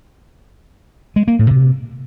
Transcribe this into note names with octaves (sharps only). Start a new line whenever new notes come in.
G#3
A#3
A2
C3